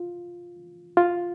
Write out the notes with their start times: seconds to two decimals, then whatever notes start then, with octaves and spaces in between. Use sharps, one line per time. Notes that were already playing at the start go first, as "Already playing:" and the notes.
Already playing: F4
0.97 F4